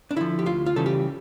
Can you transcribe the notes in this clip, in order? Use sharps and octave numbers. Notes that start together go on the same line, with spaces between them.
D4
D3 F3 E4
G4
D2 F4
F4
C#3 E3 G3 C#4 A4
G4